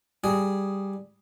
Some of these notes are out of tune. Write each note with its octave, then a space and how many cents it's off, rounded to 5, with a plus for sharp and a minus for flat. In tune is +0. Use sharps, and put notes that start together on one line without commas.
G3 +0 G#4 +0